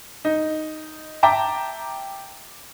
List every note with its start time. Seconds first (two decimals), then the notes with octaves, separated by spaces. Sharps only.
0.25 D#4
1.23 E5 G5 A5 A#5 D6